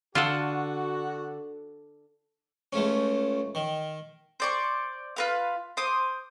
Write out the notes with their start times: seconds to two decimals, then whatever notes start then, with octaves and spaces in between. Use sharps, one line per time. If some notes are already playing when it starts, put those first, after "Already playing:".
0.15 D3 F4 F#4 A4 F#5
2.73 C#2 A3 C#4
3.55 D#3
4.40 C5 D5 C#6
5.16 F4 B4 F5
5.77 C5 D6 D#6